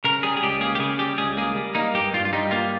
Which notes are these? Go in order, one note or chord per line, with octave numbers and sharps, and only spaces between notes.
C#3 A#4
G3 G#4
G#4
C#2 G4
A#3 G#4
G4
C#3 G#4
G3 G4
C#2 G#4
A#3 G#4
G3
A#3 D#4
G2 G4
G2 F4
F4
G3 D#4
A#3 F4